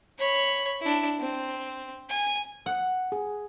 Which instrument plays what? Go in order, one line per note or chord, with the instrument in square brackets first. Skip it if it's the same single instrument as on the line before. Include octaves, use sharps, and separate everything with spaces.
[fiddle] C#5 B5
D4 E4
C4
G#5
[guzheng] F#5
[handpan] G#4